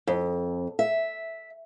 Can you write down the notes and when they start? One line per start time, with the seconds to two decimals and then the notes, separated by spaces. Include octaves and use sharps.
0.07 F2
0.79 E5